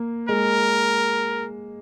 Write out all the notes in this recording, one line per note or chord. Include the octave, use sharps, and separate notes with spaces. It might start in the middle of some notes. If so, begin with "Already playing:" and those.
Already playing: A#3
G#3 A#4